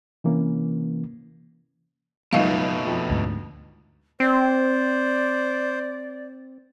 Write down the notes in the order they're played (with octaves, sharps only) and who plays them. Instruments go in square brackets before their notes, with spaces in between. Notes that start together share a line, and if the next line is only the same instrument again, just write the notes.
[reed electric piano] C3 E3 A#3 C#4
[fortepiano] C#2 F#2 [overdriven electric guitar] B2 A3 [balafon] D#4 D#5 F5
[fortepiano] F2
[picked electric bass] D2 G#2
[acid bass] C4 [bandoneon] C5 [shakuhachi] D5